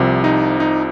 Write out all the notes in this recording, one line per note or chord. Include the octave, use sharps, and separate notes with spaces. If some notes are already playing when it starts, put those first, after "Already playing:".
Already playing: C2 C3 F3
D#4
D#4